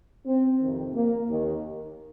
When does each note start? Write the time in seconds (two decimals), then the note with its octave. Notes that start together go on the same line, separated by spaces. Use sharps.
0.26 C4
0.60 F2 C3 D#3
0.94 A#3
1.28 D#2 D#3